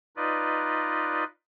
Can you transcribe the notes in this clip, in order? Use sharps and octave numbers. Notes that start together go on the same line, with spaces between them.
D#4 F4 B4 D5 D#5